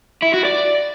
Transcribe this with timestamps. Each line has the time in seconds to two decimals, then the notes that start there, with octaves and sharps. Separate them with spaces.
0.22 E4
0.34 F#4
0.45 D5